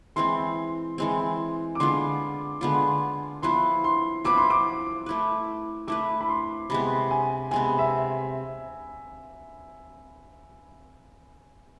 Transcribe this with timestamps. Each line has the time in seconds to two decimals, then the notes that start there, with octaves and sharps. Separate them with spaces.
0.16 E3 G#3 C4 C6
0.98 E3 G#3 C4
1.75 D6
1.80 D3 G#3 B3 F4 C6
2.61 D3 G#3 B3 F4
3.42 F3 B3 E4 B4 C6
3.84 C6
4.25 F3 B3 E4 B4 D6
4.38 C6
4.50 D6
5.06 A3 E4 B4
5.88 A3 E4 B4 D6
6.21 B5
6.29 C6
6.70 C3 G#3 B3 B5
7.11 G#5
7.51 C3 G#3 B3 G#5
7.79 E5